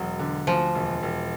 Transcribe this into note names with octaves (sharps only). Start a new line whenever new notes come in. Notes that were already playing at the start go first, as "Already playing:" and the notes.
Already playing: E1 F#3
D3
D2 F3
E1
E1